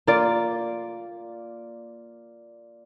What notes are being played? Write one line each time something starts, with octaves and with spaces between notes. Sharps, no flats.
A#3 F4 D5